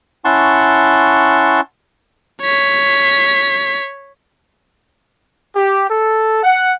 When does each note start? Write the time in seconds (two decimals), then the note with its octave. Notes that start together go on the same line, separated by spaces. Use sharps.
0.25 C#4 E4 F#5 A5 C6 C#6
2.42 C#5 B6
5.55 G4
5.89 A4
6.43 F#5